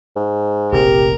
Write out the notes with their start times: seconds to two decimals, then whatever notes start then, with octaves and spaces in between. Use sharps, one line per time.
0.16 G#2
0.72 F1 A#1 C4 G4 A#4